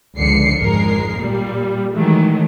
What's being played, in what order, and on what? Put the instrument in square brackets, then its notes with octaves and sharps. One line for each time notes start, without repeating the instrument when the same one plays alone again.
[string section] C#2 D3 F3 C7 C#7
G#1 F2 G#3 A#4 C7
A#2 G3
D#3 E3 F#3 G#3 A3